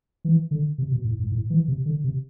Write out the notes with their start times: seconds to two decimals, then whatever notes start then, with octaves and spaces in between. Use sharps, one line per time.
0.25 E3
0.51 D3
0.78 C3
0.91 B2
1.05 A2
1.19 G#2
1.32 A2
1.50 E3
1.68 C3
1.86 D3
2.04 C3